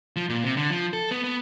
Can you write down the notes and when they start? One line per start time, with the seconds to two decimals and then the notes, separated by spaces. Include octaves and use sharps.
0.16 F3
0.29 A#2
0.44 C3
0.57 D3
0.70 F3
0.93 A4
1.11 B3
1.24 B3